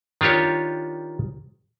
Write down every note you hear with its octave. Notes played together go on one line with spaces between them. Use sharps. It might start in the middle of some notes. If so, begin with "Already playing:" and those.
D#3 D4 F4 G4 C#5